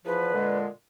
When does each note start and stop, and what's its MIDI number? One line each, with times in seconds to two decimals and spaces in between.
0.06 0.32 40
0.06 0.32 53
0.06 0.57 71
0.34 0.66 46
0.34 0.66 50
0.34 0.66 56